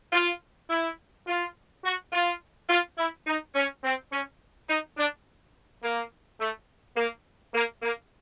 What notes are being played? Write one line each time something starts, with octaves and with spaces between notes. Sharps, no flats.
F4
E4
F4
F#4
F4
F4
E4
D#4
C#4
C4
C#4
D#4
D4
A#3
A3
A#3
A#3
A#3